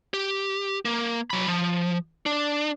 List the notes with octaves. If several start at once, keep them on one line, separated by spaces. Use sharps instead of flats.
G4
A#3
F#3 B5
F3
D4